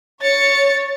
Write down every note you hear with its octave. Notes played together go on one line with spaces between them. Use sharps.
C#5 A6 C#7